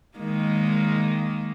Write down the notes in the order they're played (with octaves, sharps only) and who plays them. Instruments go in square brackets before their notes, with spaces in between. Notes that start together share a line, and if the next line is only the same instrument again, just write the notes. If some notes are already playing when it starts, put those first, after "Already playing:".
[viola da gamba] D#3 G#3 A#3